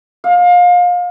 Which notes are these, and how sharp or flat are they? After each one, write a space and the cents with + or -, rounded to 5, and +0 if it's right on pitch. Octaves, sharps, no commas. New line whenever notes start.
F5 +30